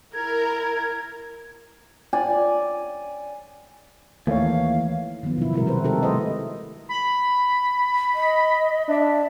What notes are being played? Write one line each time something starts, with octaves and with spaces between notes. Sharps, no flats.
E4 A#4 G#6
D5 G#5
D#2 E3 A3 C#5 F5
D#3 F3 F#3 B3
B2 E4
C3 G3 G#3 E4 F#4 A#4
D#3 C4 B4 C5
G#3 D#4 F#4 G4 A4 A#4
G3 A3 E4 C5 D#5
B5
D#5
D4 E5